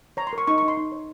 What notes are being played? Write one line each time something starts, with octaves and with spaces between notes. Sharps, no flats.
C#5 A#5
C6
A#4 C#6
D#4 C#6
D#4 C#6
C6
D#4
C#5